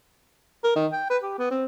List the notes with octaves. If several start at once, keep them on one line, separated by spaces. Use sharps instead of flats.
A#4
D#3
G5
B4
G4
B3
C4